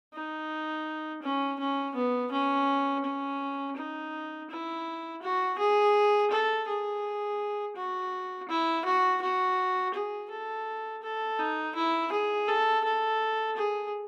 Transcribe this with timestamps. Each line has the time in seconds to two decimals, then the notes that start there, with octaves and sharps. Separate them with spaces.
0.14 D#4
1.22 C#4
1.59 C#4
1.95 B3
2.32 C#4
3.04 C#4
3.77 D#4
4.49 E4
5.22 F#4
5.58 G#4
6.31 A4
6.67 G#4
7.76 F#4
8.49 E4
8.85 F#4
9.22 F#4
9.94 G#4
10.30 A4
11.03 A4
11.39 D#4
11.75 E4
12.12 G#4
12.48 A4
12.84 A4
13.57 G#4